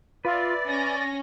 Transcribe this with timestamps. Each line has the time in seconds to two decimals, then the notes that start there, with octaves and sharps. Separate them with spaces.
0.25 F4 B4 D5 E5
0.67 C#4 A#6